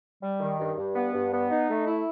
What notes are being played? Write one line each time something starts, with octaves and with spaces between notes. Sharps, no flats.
G3
D#3
G2
G2
B3
G2
B3
D#4
A3
E4